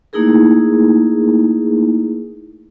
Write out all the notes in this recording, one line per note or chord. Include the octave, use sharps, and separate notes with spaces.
A3 A#3 D#4 E4 G#4 A#4